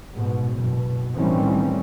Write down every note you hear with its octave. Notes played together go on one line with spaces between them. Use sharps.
G#2 B2
F#1 B2
A2 D#3 E3 G3 C4 C#4